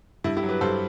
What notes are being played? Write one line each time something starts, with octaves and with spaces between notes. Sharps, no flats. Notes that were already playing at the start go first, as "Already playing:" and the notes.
G2 E4
E4 G4
F#3
G4 B4
G2 A4 C5